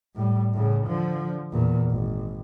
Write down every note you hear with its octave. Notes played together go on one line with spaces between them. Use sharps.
A2 G3
A2 C#3
D3 F3
E2 A#2
G#1